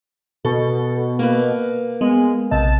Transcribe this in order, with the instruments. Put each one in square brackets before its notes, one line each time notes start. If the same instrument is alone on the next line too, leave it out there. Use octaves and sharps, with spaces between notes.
[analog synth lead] B2 [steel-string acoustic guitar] A4
[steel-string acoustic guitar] A#3 B4
[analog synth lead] G#3 [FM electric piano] B3
[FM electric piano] A#1 C3 D#5 [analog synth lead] A5